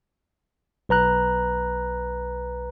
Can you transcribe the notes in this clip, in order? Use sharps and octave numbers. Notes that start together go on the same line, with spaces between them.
B1 B4 A#5 F#6